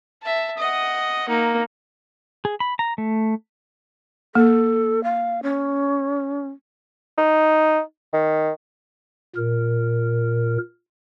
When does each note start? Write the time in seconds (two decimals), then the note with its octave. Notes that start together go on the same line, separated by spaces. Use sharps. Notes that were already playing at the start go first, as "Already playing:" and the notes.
0.22 E5 A5
0.58 D#5 F#5 D#6
1.29 A#3 D#4
2.45 G#4
2.60 B5
2.79 A#5
2.98 A3
4.35 A#3 A4
5.04 F5
5.43 C#4
7.18 D#4
8.13 D#3
9.36 A#2 A#4